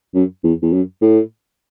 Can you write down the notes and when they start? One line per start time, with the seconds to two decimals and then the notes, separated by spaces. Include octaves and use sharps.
0.15 F#2
0.44 E2
0.62 E2
0.73 F#2
1.02 A2